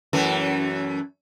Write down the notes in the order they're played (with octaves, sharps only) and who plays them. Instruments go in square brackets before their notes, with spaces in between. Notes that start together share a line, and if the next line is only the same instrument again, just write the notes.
[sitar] F#2 E3 A3